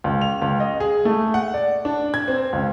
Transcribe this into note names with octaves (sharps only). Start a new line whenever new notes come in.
C#2
F7
C#2
D#5
G#4
A3
F#5
D5
D4
G#6
C4
C#2